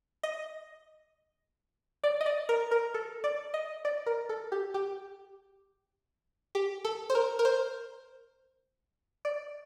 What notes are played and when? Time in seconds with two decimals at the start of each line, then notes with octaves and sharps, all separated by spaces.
0.23 D#5
2.04 D5
2.21 D#5
2.26 D5
2.49 A#4
2.71 A#4
2.94 A4
3.24 D5
3.54 D#5
3.85 D5
4.06 A#4
4.29 A4
4.52 G4
4.74 G4
6.55 G4
6.85 A4
7.10 C5
7.15 A#4
7.39 A#4
7.45 C5
9.25 D5